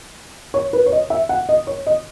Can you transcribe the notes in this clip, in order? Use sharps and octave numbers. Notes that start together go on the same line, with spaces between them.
C#5
B4
C#5
D#5
E5
F#5
D#5
C#5
D#5